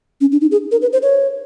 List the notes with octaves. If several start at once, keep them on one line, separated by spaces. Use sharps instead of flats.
C#4
D4
D#4
G#4
A#4
B4
C5
C#5